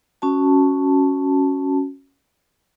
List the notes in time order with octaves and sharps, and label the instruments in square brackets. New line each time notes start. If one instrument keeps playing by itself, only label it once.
[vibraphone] C#4 F#4 A5